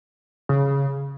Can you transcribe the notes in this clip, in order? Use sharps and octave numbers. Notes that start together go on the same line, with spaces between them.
C#3